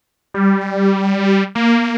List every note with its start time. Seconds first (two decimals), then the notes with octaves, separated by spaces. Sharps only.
0.34 G3
1.55 A#3